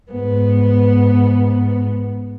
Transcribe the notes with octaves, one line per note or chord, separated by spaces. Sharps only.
G#2 B3